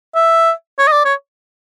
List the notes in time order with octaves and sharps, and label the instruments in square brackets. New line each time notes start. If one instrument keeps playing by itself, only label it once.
[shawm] E5
C#5
D#5
D5
C#5